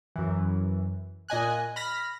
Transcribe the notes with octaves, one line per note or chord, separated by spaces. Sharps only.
F#2 E3
A#2 D#5 G#5 F#6
B5 F6 A#6 B6